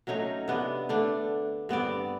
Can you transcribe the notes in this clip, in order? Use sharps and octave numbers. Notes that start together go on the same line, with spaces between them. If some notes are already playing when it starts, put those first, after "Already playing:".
F#3 A3 C#4 D#4
C3 B3 D4
D3 A3 D4
G2 B3 C4 D5